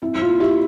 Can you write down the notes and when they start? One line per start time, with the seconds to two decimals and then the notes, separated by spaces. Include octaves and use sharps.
0.02 C4 E4
0.15 E4
0.21 F4
0.40 E4 G4